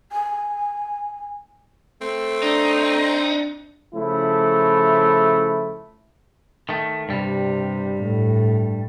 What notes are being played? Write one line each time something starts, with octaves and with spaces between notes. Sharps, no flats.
G#5
A3 C4
D4 D#4
C#3 F3 A3 E4
D#3 A3
G2 C3 G3
A2 A3